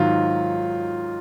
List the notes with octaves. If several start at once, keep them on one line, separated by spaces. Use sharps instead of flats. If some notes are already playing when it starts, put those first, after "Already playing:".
Already playing: G#2 D#3 F#3 F4